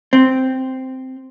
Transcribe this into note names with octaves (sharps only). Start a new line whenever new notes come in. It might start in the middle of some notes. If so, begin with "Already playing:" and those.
C4